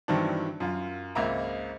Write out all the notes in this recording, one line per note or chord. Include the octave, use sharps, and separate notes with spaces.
G2 D#3 E3 F#3 C4 D4
F#2 F4
G#1 C#2 A#3 E5 A#5